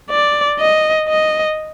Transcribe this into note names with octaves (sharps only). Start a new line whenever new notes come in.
D5
D#5
D#5